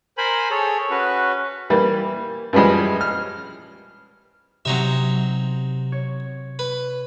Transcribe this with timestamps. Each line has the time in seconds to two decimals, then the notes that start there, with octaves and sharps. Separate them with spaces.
0.18 A#4 C5 G#5 B5
0.51 G#4 A4 C#5
0.90 C#4 F#4 B4
1.70 E3 G3 A#3
2.53 F#2 E3 F3 G3 G#3
3.01 F6
4.65 C3 F#3 C4 D#4 E5
5.92 C#5
6.59 B4